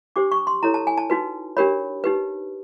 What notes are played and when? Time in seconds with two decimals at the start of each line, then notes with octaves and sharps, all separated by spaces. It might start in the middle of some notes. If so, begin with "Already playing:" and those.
0.16 D4 G4 C5 D6
0.32 C#6
0.47 C6
0.63 E4 A4 C#5 A#5
0.74 A5
0.87 G#5
0.98 A5
1.10 D#4 F#4 B4
1.57 D4 G4 A#4 C#5 B5
2.04 D#4 G4 B4